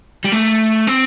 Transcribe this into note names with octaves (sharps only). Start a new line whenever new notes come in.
G3
A3
C4